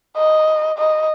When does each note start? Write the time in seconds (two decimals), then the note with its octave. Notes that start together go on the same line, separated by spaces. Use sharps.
0.17 D#5
0.78 D#5